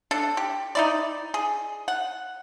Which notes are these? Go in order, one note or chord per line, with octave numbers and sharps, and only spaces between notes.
D4 A4
G4
D#4 E4 D5
G#4
F#5